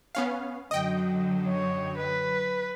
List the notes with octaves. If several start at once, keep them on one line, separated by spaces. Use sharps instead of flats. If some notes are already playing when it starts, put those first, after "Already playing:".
B3 C#4 F5
F#2 D3 F#3 D#5 G5
C#5
B4